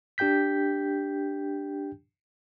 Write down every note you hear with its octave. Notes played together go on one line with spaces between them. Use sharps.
D4 G4 G5 G6 B6